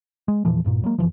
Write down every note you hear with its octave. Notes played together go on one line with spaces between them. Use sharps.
G#3
E1 A#2 E3 F3
A#1 G2 A#2
F#3 G#3 A#3
F#2 A#2 E3 F3